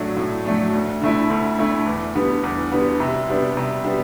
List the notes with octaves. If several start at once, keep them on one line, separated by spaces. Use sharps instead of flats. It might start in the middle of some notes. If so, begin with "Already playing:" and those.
Already playing: A2 F#3 A3 D4
A2
F#3 A3 D4
D2
D3 A3 E4
D2
D3 A3 E4
E2
D3 G3 B3
E2
D3 G3 B3
C3
G3 B3 D4
C3
G3 B3 D4